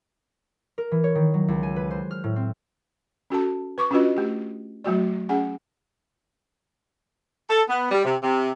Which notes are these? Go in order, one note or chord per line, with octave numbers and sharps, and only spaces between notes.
A#4
E3
C#5
D#3
F#3
C#2
G#5
B4
C5
F6
A2
C4
C#4 F#4 A4 A5
B4 C#6 D6
C#4 D4 F4 F#4 B4 D#5
A3 G4
F#3 A3 F#4 D5
C#4 G#4 F#5 G#5
A4
B3
G3
C3
C3